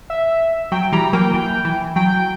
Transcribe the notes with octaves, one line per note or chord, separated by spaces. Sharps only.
E5
F#3 G5
E3 G3 A#5
F#3 A#3 G5
E3
E3
F#3 G5